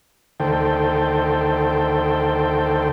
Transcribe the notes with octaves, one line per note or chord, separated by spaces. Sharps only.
D2 D#3 A4 C5 G5